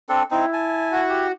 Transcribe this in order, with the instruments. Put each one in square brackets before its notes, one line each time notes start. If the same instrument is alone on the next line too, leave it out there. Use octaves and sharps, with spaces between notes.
[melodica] C4 D4 A4
[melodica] C4 D#4 [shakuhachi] E4
[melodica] G#5 A5
[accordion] F#4
[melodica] G4